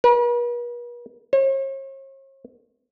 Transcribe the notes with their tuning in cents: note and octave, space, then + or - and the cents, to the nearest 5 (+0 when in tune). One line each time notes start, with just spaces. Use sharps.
B4 -45
C#5 -45